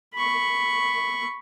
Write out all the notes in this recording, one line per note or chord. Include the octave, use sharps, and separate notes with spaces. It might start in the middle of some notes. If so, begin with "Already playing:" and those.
B5 C#6